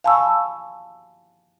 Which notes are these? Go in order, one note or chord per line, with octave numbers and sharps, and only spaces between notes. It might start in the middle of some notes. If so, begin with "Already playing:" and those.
F5 G#5 A5 B5 C#6 E6